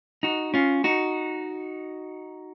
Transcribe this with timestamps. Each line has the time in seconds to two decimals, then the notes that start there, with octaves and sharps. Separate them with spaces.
0.23 D#4 F#4
0.54 C#4 F4
0.84 D#4 F#4